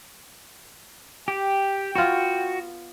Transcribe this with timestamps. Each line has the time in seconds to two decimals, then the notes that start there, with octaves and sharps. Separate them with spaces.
1.28 G4 G5
1.95 B3 F4 F#4